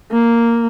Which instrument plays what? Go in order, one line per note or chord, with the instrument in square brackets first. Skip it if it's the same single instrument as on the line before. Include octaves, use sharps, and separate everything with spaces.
[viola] A#3